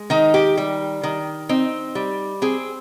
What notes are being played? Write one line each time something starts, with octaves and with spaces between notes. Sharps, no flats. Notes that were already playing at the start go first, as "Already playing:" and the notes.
Already playing: G#3
D#3 D#4
G4
G3
D#3
C4 D#4
G3
C4 G#4